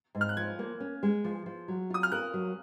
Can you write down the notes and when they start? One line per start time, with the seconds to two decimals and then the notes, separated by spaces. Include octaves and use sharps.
0.15 G#2
0.21 F6
0.29 F#6
0.37 F3 G#6
0.59 A#3
0.80 C#4
1.03 G#3
1.24 F3
1.46 F3
1.68 F#3
1.90 F4 D#6
2.03 F6
2.12 A#4 F#6
2.34 F#3